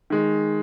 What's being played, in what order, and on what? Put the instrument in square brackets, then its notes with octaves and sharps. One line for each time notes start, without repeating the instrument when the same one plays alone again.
[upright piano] D#3 G#3